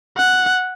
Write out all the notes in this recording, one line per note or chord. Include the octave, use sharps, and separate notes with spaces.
F#5